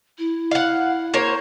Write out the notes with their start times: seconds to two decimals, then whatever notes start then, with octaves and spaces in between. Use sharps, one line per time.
0.18 E4
0.51 F5 F#5
1.14 A#3 C5 C#5